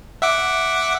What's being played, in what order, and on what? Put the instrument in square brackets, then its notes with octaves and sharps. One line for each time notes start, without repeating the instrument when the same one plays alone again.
[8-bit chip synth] E5 F#5 D6